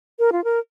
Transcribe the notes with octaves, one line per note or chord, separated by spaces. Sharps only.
A#4
F4
A#4